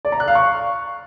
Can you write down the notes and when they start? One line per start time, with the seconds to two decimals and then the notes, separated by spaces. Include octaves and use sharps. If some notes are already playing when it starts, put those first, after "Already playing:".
0.05 D5
0.12 A#5
0.20 F#6
0.28 F5
0.35 C#6